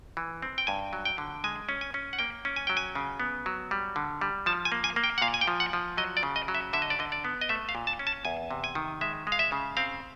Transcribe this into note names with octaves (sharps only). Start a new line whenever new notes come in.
E3
C4
G5
G2 G#5
F#3
G5
D3
G#3 G#5
C#4
G#5
C#4
F#5
A#3 G5
C#4
G#5
F#3 G5
G#5
C#3
B3
F#3
G3
D3
G3
F3 A5
G#5
A#3
G#5
A#3
G5
F#5
A#2 F5
G#5
G5
F3
F#5
F3
F#3 D#5
D5
C#3
D#5
F#3
E5
D3 E5
D#5
D5
D3 D#5
D5
B3
D#5
A3 E5
F5
A#2
A5
C#4
A5
E2 G#5
C3
G#5
D#3
G#3 E5
G#3
F5
E5
C#3
C4 F5